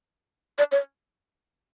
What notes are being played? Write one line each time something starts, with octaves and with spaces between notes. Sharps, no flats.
D5
C#5